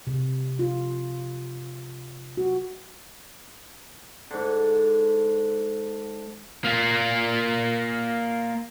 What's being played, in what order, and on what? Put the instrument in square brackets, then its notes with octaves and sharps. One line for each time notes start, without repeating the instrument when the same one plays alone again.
[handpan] C3
F4
F#4
[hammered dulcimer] G#2 D3
[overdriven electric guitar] A#3 F4